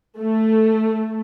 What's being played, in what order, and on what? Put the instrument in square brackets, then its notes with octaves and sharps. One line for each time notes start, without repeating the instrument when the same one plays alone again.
[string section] A3